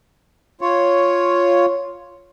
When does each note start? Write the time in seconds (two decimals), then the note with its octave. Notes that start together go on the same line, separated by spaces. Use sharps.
0.61 F4 C#5